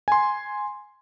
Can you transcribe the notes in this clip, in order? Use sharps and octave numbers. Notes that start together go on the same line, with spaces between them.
G#5 C6